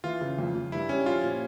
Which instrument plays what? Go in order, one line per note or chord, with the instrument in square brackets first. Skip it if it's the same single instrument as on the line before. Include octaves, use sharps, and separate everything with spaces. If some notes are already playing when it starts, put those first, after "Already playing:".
[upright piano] E3 [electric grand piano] F4
[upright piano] C#3
F2
F2
[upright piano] G2 [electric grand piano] E4
[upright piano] G3 [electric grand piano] C#4
[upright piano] F3 [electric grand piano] F4
[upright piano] A#2